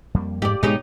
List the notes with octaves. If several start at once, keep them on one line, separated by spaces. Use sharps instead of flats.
F2 G3 A#3
G#2 G4 D5
G#2 B2 G#3 B3 D#4 G4 C#5